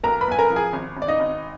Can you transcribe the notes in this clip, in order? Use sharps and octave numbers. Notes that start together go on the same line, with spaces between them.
B1 A#4 A#5
B4 B5
B1 G#5
A#4 A#5
F3
G#4 G#5
G#1
G#1
D5
D#4 D#5
G#1